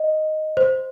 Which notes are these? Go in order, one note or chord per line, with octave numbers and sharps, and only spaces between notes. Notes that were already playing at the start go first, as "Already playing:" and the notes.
Already playing: D#5
C5